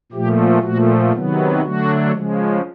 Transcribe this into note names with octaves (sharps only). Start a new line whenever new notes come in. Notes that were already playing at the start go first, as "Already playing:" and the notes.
A#2 F3 A3 G4
A#2 F3 A3 F#4
C3 D#3 F#3 B3
D3 F#3 A3 D4 F#4
C#3 F3 G#3